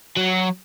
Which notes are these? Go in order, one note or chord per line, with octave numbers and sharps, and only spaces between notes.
F#3